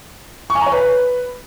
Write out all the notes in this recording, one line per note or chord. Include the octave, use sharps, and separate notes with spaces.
C#6
G#5
A#5
C#5
B4